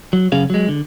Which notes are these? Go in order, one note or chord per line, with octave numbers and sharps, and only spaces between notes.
F#3
F#2 C#3 C#4 G#4 F5
F#3 G#3
D3